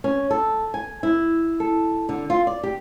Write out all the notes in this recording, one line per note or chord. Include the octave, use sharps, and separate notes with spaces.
C#4
A4
G#5
E4
A4
D3
F4
D5
G4